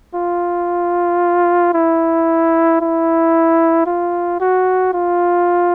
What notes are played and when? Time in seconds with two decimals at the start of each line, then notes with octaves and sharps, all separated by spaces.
0.15 F4
1.74 E4
2.81 E4
3.86 F4
4.40 F#4
4.94 F4